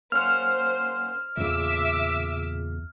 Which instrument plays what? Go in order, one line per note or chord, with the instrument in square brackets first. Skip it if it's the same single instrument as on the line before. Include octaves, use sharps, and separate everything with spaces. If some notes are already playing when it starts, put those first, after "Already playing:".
[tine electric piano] A#3 C#4 F#5 [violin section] C5 [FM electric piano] F6
[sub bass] E2 [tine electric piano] A#2 C#3 [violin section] E5 D6 E6